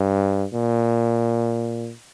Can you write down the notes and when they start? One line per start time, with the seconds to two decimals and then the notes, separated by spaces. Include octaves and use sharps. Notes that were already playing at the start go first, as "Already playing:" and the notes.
Already playing: G2
0.53 A#2